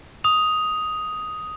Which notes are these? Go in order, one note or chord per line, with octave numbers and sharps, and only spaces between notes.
D#6 F7